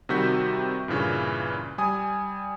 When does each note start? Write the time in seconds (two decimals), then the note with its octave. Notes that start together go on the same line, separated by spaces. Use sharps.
0.09 C3 D#3 G3 F#4 G6 B6
0.88 G2 A#2 C#3 E3
1.78 G3 G#5 D#6